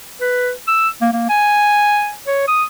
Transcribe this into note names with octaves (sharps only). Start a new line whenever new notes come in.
B4
E6
A#3
A#3
G#5
C#5
D#6